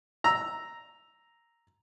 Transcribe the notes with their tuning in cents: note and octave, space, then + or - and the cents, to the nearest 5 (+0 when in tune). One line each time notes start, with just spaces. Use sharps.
A#5 +0 E6 +0